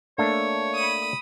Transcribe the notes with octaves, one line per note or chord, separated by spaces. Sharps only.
A3 A#3 D4 C#5
B5 D#6